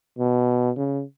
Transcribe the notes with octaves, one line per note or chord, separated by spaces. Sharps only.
B2
C#3